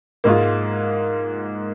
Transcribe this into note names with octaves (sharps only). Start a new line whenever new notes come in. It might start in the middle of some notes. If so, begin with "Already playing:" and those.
G#2 G#3 A#3 F4